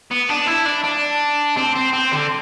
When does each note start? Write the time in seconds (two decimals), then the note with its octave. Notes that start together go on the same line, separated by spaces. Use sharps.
0.11 B3
0.29 D4
0.47 E4
0.66 D4
0.84 D4
1.57 C4
1.75 C4
1.93 C4
2.11 D3